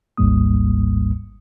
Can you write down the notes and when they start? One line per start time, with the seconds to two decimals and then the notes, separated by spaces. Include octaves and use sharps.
0.17 G#1 D2 G#2 G3 A#3 D#6